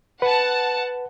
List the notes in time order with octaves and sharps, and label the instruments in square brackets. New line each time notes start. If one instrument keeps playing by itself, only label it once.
[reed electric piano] B4 [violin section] F#5 A5